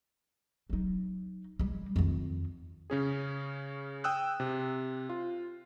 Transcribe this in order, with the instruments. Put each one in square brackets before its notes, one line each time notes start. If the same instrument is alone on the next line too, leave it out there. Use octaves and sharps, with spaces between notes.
[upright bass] F#3 D#4
G3 G#3
F2 D#3
[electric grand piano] C#3 C#4 G#4
G5 D#6 E6 F#6
C3
F4